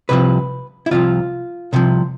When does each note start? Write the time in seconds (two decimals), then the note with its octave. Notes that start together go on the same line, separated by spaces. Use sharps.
0.09 C2 C3 F3 B4
0.86 E4
0.91 C2 C3 F3 F4
1.73 C2 C3 F3